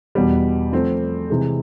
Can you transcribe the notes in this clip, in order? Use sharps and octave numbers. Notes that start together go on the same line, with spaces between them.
E2 B2 G3
F3 A3 C4
C3 E3 G#3